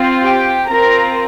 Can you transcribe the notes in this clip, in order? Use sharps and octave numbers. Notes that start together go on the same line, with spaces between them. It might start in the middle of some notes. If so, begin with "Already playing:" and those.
Already playing: C4 F4
G4 G5
C4 F4 A#4 A#5